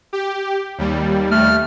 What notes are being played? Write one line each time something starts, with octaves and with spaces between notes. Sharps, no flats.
G4
D#2 G3
A3 F6